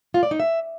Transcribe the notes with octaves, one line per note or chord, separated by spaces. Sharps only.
F4
D5
D#4
E5